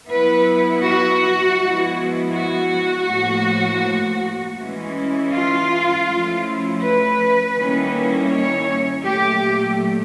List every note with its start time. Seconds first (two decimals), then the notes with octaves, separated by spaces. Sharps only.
0.10 F#3 B3 E4 B4
0.85 F#4
1.59 F3 G#3 B3 E4
2.33 F#4
3.08 A2 F3 A#3
4.57 E3 G#3 C#4 E4
5.32 F4
6.06 F3 A3 C#4 E4
6.81 B4
7.56 D#3 G3 A#3 C#4 E4
8.31 C#5
9.05 A#2 F#3 A3 G4